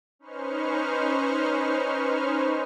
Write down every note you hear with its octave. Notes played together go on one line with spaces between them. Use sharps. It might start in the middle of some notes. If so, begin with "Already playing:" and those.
C#4 D#4 B4 C5 C#6 F6